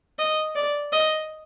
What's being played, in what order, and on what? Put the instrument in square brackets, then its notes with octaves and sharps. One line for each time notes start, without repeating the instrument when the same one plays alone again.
[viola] D#5
D5
D#5